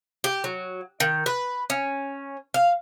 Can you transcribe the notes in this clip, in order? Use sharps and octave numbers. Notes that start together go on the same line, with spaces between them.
G4
F#3
D#3
B4
C#4
F5